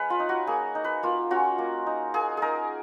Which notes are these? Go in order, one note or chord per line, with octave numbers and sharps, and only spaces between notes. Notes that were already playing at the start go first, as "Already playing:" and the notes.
Already playing: G#3 C#4 B4 C#5 F5
F4
D#4
F#4
A#3 G#4
D#4
B4
A#3 F4
C#4 F4 F#4
A#3
D#4
A#3 G#4
D#4 G#4 A#4